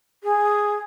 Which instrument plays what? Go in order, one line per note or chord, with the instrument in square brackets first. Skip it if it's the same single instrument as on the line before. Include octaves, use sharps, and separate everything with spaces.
[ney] G#4